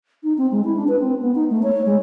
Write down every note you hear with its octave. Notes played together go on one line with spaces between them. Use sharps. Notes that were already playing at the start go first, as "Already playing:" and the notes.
D#4
C4
G#3
E4
D4
B4
C4
B3
D#4
A3
C#5
G#3